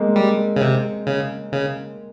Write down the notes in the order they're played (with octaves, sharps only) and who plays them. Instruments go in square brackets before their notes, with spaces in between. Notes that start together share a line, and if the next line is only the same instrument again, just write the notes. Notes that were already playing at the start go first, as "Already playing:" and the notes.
Already playing: [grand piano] G#3 A#3 C4
[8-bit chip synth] G3
C#3
C3
C#3
C#3